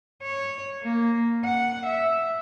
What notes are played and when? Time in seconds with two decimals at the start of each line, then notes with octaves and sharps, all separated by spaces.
0.23 C#5
0.82 A#3
1.44 F#5
1.86 E5